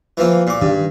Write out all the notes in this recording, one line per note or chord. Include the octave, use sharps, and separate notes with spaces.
E3 F3 A#3
A#2 D6
G2 D#3